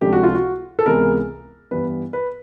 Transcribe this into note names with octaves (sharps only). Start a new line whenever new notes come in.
C#2 C3 F3 A3 D4 G4
F#4
F4
F#4
A4
C#2 C3 E3 G#3 B3 A#4
G2 E3 G3 B3 B4
B4